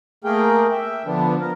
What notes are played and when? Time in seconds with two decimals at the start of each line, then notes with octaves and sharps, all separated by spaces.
0.24 A3 A#3 G#4 A#4 G5
0.72 E5 G5
1.06 D3 F3 B3 D4
1.41 A#4